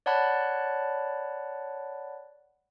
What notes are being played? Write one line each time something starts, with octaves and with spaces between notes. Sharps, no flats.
C#5 D5 F#5 A5 B5 F#6